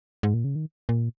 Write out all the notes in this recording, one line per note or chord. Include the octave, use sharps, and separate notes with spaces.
G#2
A#2
C#3
D#3
A#2